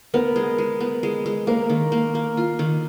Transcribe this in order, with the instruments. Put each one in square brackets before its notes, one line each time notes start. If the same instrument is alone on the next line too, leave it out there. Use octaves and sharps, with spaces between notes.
[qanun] B3 [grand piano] A#4
[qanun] G#3
G#3
B3
G#3
G#3
[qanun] A#3 [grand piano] A#4
[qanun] D#3
A#3
A#3
F4
D#3